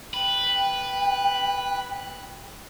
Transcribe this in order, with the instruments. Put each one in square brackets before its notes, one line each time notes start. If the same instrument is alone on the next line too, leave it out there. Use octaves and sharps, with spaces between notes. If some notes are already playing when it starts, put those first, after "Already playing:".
[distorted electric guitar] B4 [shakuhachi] G5